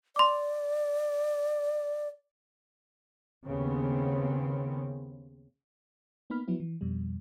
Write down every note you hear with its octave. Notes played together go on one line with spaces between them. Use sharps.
D5 C6 D6
D#2 C#3 B3 C4
A#3 B3 D#4 B5 F6
F3 F#3 B3 E4
E3
F2 B2 G3